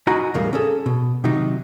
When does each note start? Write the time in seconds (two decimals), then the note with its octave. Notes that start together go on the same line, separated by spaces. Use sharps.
0.07 D#4 F#4 G#5 A#5 B5
0.34 E2 A2 C#3 G3 A#4 F5
0.53 C#4 G#4 A4
0.86 B2
1.24 C3 D#3 F#3 D#4